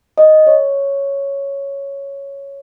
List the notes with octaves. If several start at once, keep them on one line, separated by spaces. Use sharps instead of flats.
D#5
C#5